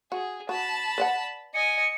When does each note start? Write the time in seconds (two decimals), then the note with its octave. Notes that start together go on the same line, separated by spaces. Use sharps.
0.12 F#4 G#4
0.49 F#4 A5 B5
0.98 B4 D5 F#5
1.54 D#5 G#5 C#7